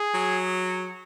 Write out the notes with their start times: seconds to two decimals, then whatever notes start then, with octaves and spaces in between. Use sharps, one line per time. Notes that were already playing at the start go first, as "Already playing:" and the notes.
Already playing: G#4
0.14 F#3